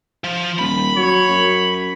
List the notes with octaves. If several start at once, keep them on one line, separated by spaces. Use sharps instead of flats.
F3
D#1 B5
F#3 C#5
F#2